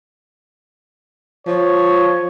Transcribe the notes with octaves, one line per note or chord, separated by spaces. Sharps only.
F3 C#5